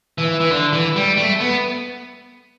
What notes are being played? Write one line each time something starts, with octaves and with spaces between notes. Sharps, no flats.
E3
E3
D3
E3
G3
A3
B3